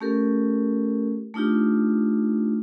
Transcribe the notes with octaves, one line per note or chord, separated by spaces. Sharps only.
A3 C#4 G4 A4 A#4
A3 D4 D#4 F4 G4